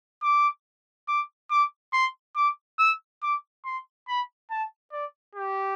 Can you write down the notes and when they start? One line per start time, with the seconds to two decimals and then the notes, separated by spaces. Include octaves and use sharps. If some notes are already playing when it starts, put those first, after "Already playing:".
0.22 D6
1.08 D6
1.51 D6
1.93 C6
2.36 D6
2.79 E6
3.22 D6
3.65 C6
4.08 B5
4.51 A5
4.92 D5
5.35 G4